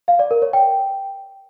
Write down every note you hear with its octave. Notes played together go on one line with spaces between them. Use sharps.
F5
D5
A#4
C#5
G5